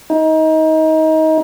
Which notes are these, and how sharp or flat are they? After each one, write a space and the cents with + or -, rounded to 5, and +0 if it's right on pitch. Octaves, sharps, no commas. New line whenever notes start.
D#4 +25